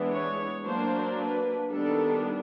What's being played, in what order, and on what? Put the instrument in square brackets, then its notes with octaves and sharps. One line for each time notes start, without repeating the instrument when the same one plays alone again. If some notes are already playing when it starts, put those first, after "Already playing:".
Already playing: [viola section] E3 G#3 B3 D4
C#5
F#3 A#3 D4 C5
B4
D#3 G3 B3 D4 A4